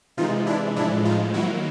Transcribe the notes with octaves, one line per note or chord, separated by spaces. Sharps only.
C3 E3 G#3 D#4 F4
D4 E4
A2 F3 G#3 D4 E4
D#4 F4
D#3 F#3 A#3 E4 F#4